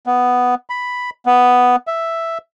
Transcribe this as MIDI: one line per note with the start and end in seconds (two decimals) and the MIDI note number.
0.06 0.55 59
0.70 1.10 83
1.26 1.76 59
1.87 2.38 76